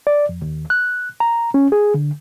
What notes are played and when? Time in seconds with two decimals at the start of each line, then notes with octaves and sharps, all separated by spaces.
0.07 D5
0.29 F2
0.42 D#2
0.70 F#6
1.20 A#5
1.54 C#4
1.72 G#4
1.94 D3